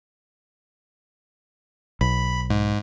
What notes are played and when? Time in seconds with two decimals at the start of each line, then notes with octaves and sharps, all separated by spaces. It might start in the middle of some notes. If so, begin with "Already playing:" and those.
2.01 B1 B5
2.50 G#2